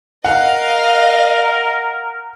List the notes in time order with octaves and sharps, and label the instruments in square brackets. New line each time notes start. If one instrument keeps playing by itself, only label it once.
[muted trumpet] A#4 [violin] D#5 F5 [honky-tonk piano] F#5